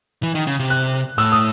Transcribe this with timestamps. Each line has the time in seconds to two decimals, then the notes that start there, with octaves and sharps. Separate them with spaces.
0.23 E3
0.35 D#3
0.47 C#3
0.59 C3
0.70 F#6
1.18 A2 E6
1.32 D#6